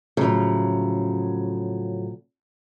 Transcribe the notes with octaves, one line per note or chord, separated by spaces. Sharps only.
A2 C#3 F3 F#3